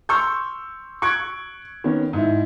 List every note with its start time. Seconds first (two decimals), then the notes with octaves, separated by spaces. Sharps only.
0.09 C6 C#6 E6 F6 G6
1.02 C#6 F#6 G#6 D7
1.84 D#3 B3 C#4
2.13 G#2 E4